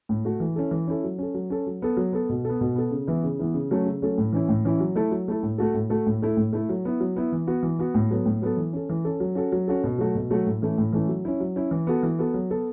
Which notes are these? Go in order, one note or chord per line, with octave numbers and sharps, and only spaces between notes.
A2
A3 F#4
E3
C#4 E4 A4
E3
C#4 E4 A4
F#3
C#4 A4
F#3
C#4 A4
F#3
B3 A4
F#3
B3 A4
B2
B3 A4
B2
B3 A4
C#3
E3 B3 E4
C#3
E3 B3 E4
C#3
F#3 A3 C#4 A4
C#3
F#3 A3 C#4 A4
A2
E3 C#4 E4
A2
E3 C#4 E4
F#3
A3 E4 A4
F#3
A3 E4 A4
A2
A3 F#4 A4
A2
A3 F#4 A4
A2
A3 E4 A4
A2
A3 E4 A4
F#3
B3 E4
F#3
B3 E4
E3
B3 F#4
E3
B3 F#4
A2
F#3 B3 A4
A2
F#3 B3 A4
E3
C#4 A4
E3
C#4 A4
F#3
C#4 F#4 A4
F#3
C#4 F#4 A4
B2
F#3 A3 F#4 A4
B2
F#3 A3 F#4 A4
A2
E3 A3 C#4 E4
A2
E3 A3 C#4 E4
F#3
C#4 E4
F#3
C#4 E4
E3
B3 F#4 A4
E3
B3 F#4 A4
F#3
B3 A4